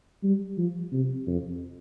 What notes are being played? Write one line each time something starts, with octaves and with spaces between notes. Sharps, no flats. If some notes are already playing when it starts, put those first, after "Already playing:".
G3
F3
C3
F2